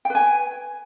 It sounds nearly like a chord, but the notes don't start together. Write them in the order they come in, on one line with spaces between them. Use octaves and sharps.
G5 B4 G#5